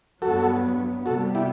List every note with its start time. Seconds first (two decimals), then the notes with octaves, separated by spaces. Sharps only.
0.22 G2 F#3 B3 F#4 A4
1.06 C3 G3 B3 F#4 A4
1.35 E4 G4